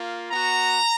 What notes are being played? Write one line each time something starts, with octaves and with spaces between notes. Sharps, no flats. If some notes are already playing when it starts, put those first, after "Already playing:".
Already playing: A#3 F4
B3 F#4 A#5